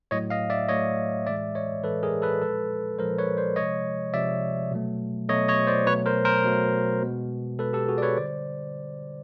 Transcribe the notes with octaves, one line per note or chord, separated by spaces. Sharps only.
A2 F#3 A3 C#5 D#5
D#5 F5
D5 E5
A2 F#3 A3 C#5 D#5
A2 E3 G#3 D5 E5
C#5 D#5
A2 E3 G#3 A4 B4
G#4 A#4
A4 B4
A#2 F3 G#3 A4 B4
A#2 F3 G#3 A#4 C5
B4 C#5
C5 D5
C3 F3 G#3 C#5 D#5
C3 F3 G#3 D5 E5
B2 F#3 A3
B2 F#3 A3 C#5 D#5
C#5 D#5
C5 D5
B2 F#3 A3 B4 C#5
A#4 C5
A#4 C5
B2 F#3 A3
B2 G#3
B2 G#3 A4 B4
G4 A4
F#4 G#4
D5
B4 C#5
D3 G3 C5 D5